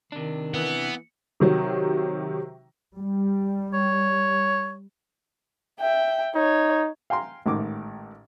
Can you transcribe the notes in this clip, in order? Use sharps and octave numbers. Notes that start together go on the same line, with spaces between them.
C3 D#3 D4
E3 B3
C3 D#3 F#3
G3
C#5
E5 G5
D#4 C#5
F5 G5 G#5 A#5 C6
A1 G#2 D#3 D6